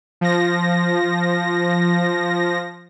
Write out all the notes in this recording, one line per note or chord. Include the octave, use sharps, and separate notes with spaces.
F3 A#6